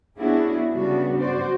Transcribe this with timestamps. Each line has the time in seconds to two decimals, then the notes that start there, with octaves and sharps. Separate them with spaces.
0.18 B3 C#4 D4 E4 F#4 G#4
0.74 C#3 G3 B3 D4 F#4
1.19 F#4 C5 D5